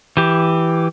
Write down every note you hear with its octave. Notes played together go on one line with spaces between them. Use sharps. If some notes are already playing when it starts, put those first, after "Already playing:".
E3 G4